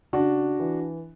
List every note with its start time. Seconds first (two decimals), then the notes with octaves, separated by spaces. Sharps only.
0.13 C#3 D4 F#4
0.59 E3